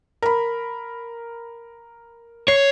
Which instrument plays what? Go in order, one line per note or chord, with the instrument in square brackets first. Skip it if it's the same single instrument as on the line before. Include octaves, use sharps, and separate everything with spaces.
[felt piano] A#4 B5
[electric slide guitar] C#5 [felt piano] C7